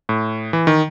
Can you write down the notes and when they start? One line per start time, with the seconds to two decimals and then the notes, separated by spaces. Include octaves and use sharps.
0.09 A2
0.53 E3
0.67 D#3